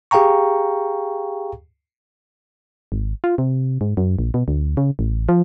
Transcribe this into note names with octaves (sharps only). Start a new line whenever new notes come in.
G4 G#4 F5 G5 A#5 C#6
G#1
F4
C3
G#2
F#2
A#1
B2
D2
C#3
A1
F3